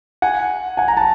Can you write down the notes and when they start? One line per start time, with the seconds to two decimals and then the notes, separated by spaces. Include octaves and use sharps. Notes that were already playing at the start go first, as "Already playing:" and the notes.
0.22 F#5 G#5
0.77 F#5 G#5
0.88 A#5
0.97 A5